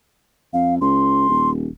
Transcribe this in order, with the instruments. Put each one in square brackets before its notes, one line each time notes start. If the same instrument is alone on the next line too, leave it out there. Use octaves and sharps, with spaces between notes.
[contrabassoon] F2 [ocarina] F5
[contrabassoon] C#2 [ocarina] C6
[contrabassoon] D#1